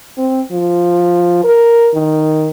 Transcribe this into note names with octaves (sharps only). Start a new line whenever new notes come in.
C4
F3
A#4
D#3